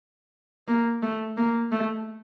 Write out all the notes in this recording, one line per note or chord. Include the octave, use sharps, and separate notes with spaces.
A#3
A3
A#3
A3